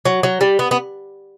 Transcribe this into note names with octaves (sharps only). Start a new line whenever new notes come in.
F#3
F#3
G3
B3
B3